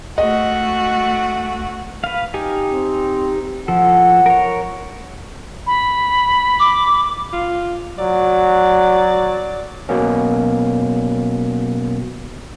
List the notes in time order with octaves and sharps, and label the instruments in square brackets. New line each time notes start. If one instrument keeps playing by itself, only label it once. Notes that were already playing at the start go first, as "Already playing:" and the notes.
[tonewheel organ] C#2 [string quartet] A3 F#4 [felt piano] D#5
[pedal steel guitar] B4 F5
D#4 G4 G#5
[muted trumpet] C4
[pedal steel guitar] F3 A4 [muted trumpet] F#5
[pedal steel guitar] A#4 C#5
[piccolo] B5
[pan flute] D6
[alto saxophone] F4
[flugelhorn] F#3 [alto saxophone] D5
[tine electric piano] B2 F#3 A#3 B3 C#4